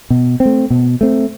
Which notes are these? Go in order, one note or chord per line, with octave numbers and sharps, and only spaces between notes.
B2
C4
A3
B2
A3 C4